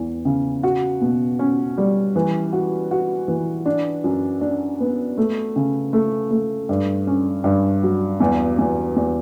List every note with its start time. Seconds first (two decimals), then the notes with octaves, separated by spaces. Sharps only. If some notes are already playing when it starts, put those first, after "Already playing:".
Already playing: E2 E3
0.25 C#3
0.63 F#4
1.01 B2
1.39 C#4
1.78 G3
2.16 E3
2.53 F#4
2.91 F#4
3.28 E3
3.66 D4
4.04 F#2
4.41 D4
4.80 B3
5.17 A3
5.56 C#3
5.93 A3
6.31 A3
6.69 G2
7.07 C#4
7.44 G2
7.83 F#3
8.20 E2
8.59 E2
8.96 E2